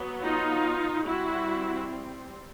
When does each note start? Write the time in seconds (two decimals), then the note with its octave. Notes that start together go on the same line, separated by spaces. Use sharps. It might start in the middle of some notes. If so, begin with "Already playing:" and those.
Already playing: F#3 B3
0.22 D#4 F4
1.04 G3 C4 E4 F#4